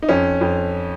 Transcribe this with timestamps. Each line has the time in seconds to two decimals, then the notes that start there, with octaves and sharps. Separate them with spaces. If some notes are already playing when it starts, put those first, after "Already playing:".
0.02 D#4
0.09 F2 C#4
0.41 F2